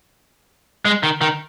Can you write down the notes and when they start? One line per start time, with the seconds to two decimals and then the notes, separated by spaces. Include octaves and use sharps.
0.85 G#3
1.03 D#3
1.21 D#3